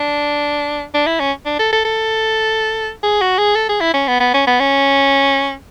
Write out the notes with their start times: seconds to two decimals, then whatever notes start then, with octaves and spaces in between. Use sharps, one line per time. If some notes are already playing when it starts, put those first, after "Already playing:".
Already playing: D4
0.94 D4
1.06 E4
1.20 C#4
1.46 D4
1.59 A4
1.73 A4
1.85 A4
3.03 G#4
3.21 F#4
3.38 G#4
3.55 A4
3.69 G#4
3.81 E4
3.94 C#4
4.08 B3
4.20 B3
4.34 C#4
4.47 B3
4.60 C#4